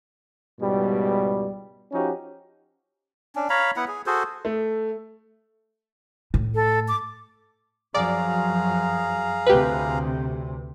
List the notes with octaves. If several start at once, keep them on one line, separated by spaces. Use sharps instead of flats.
C#2 G#2 B2 G3
F3 C#4 D#4 F#4 G4
C#4 D4
C#5 F5 A#5 B5
B3 E4 F#5
G#4
F#4 G#4 A4 C5
A3
A2
A4
D6
F#2 F3 F#3 G#4 D5 F5 A#5
D2 C3 G4 B4